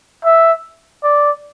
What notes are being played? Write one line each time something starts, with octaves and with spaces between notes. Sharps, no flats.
E5
D5